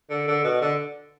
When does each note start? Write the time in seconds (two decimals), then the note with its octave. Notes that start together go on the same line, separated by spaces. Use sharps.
0.10 D3
0.28 D3
0.44 B2
0.62 D3